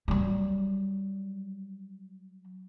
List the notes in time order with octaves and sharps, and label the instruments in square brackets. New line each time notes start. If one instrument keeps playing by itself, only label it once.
[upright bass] F#3 G3